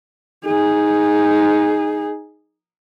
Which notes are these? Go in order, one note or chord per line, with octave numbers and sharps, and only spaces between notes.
D#4 G#4